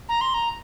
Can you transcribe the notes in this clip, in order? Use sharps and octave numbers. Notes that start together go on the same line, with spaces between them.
A#5
C6
A#5